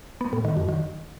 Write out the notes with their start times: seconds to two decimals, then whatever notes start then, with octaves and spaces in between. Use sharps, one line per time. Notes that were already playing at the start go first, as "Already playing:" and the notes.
0.21 B3
0.33 A2
0.45 D#3
0.57 F#2
0.69 D#3